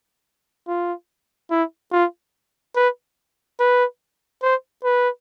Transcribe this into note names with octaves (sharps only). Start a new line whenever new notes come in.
F4
E4
F4
B4
B4
C5
B4